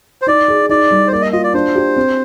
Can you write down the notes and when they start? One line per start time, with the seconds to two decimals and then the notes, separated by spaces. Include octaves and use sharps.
0.22 C5
0.27 D#4 D5
0.48 G#4
0.69 D#4 D5
0.91 G3
1.08 C5
1.12 A#3 D5
1.22 D#5
1.32 F4 D#5
1.44 D5
1.54 D4 C5
1.76 G4
1.96 C4